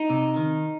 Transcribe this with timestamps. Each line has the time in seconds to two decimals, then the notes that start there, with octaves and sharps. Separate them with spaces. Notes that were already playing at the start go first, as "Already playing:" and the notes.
Already playing: D#4
0.10 C3
0.36 D#3